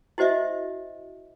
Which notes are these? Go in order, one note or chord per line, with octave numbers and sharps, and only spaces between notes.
E4 F#4 C5 D#5 E5